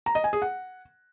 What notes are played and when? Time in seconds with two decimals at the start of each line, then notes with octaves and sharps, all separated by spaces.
0.06 A#5
0.15 D#5
0.24 G#5
0.33 G#4
0.42 F#5